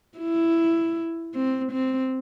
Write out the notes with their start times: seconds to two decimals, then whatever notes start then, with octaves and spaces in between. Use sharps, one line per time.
0.18 E4
1.34 C4
1.72 C4